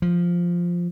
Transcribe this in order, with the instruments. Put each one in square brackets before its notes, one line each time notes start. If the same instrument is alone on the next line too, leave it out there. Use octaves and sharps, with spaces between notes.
[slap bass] F3